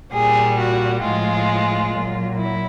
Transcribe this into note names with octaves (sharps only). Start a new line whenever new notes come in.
A#2 G3 G#4
F#4
A2 F3 G#3 F4
A#2 F#3
E4